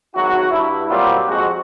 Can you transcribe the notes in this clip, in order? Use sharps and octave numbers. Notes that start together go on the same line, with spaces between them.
G#1 F#3 E4 F#4
G2 E4
A#2 F#3 G3 C4 F4 G4
F2 G#3 C4 F#4